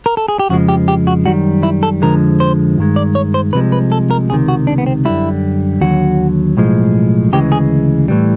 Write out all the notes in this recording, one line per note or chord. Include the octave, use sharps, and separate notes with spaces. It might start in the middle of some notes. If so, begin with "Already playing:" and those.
A#4
A4
G#4
G4
F2 C#3 F3 G#3 F#4
G4
G4
F#4
F#2 D#3 G3 F#4
E4
A4
F2 D3 F3 G#3 A#4
C5
G2 D#3 G#3
D5
C#5
C5
C2 C3 F3 G#3 B4
B4
A4
A#4
C#2 C3 D#3 G#4
F#4
D4
B3
C4
F#2 D3 G3 E4
D#2 D3 F#3 F#4
B1 A2 F3 G#3
D2 C#3 E3 G#3 G4
G#4
A2 E3 G3